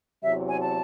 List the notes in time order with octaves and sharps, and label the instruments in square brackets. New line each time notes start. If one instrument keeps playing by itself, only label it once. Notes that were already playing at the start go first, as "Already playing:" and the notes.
[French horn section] E2 C3 F#3 [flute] E5
[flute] G#5
A5